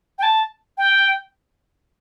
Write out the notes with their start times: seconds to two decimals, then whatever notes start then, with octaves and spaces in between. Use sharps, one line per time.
0.19 G5
0.23 A5
0.78 G5